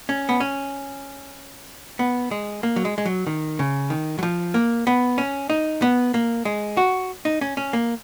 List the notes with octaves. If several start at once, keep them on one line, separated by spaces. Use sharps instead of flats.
C#4
B3
C#4
B3
G#3
A#3
F#3
G#3
G#3
F#3
D#3
C#3
D#3
F#3
F3
A#3
B3
C#4
D#4
B3
A#3
G#3
F#4
D#4
C#4
C#4
A#3